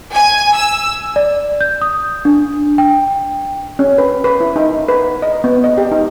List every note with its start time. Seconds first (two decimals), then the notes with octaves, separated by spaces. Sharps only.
0.13 G#5
0.55 E6
1.16 D5
1.61 G6
1.82 D#6
2.25 D4
2.78 G5
3.79 C#4
3.98 B4
4.24 B4
4.41 E4
4.56 D#4
4.89 B4
5.22 D#5
5.44 B3
5.64 D#5
5.78 G4
5.92 D#4